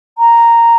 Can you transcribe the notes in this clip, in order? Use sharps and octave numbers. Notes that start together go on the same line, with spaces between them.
A#5